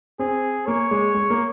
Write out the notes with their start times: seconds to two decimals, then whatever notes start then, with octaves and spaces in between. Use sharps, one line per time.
0.19 C4 G#4
0.67 A#3 C#5
0.91 G#3
1.14 G#3
1.30 A#3